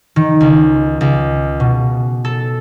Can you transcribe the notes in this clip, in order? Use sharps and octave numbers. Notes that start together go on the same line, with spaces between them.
D#3
C#2
C#2
B2
A4